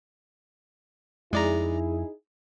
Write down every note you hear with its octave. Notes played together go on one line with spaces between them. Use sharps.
F2 G#3 D#4 E4 G#4 D5 A#5